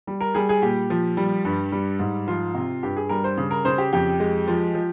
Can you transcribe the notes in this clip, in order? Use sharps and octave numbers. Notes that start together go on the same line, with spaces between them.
G3
A#4
G3 G#4
G#4
A#2 G4
F3
G3
G2
G3
G#2
F3 F4
C3
G2 G4
G#4
G3 A#4
C5
C#3
A#4
C#3 C5
G4
F2 G4
G#3
F3
F3